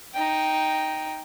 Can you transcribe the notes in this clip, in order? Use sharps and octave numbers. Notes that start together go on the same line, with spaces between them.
D#4 G5